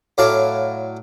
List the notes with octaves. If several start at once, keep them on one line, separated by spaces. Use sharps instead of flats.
A2 F#3 D5 F5 A#5